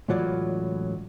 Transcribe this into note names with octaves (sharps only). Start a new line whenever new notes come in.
C#2 A2 E3 F#3 F4 D5